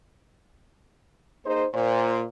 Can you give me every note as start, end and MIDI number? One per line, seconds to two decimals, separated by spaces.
1.46 1.65 58
1.46 1.65 63
1.46 1.65 68
1.46 1.65 72
1.74 2.22 46
1.74 2.22 72